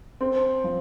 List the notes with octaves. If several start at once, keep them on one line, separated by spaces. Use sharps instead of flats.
C4
F3